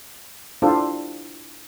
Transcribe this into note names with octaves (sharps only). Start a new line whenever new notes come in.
D4 E4 F4 G4 A4 C5